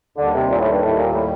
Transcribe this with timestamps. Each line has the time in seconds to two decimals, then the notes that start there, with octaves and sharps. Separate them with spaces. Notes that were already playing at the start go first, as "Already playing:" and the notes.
0.17 D#2 D3 D#3 G3
0.34 C3
0.50 A#2
0.60 A2
0.71 G2
0.81 A2
0.97 A#2
1.12 A2